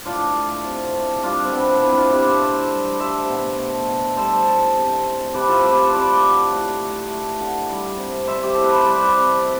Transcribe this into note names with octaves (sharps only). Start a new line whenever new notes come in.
A2 D4 F4
A3
C3
A3
G3 D4 F4
C4
B2 B3 D4
A3 C4 E4
D4 F4
B2 E4 G4
C5 E5
A2
G3
A3 C5 E5
B2
A3
B2
G3 A4 C5
A2
C3
A3
C3 G4 B4
F4 A4
A3 G4 B4
A4 C5
A3 B4 D5
D3
A2
A3
A3
D3
G3
C3
G3 C5 E5
G4
A2 A4
B4
C5
G3 B4 D5
C3
A3 E5